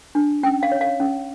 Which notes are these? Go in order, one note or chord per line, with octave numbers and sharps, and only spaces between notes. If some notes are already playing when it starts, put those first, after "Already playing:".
D4
C#4 G5
F5
C#5
F5
C#4